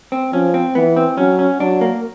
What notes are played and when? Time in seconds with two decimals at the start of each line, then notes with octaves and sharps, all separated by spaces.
0.12 C4
0.33 F3 C#4
0.54 C4
0.75 E3 B3
0.96 C4
1.18 F#3 C#4
1.39 C#4
1.60 F#3 D4
1.81 A#3